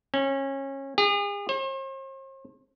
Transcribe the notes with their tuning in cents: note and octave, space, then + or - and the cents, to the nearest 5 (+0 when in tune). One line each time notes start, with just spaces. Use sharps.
C#4 -25
G#4 -40
C5 +45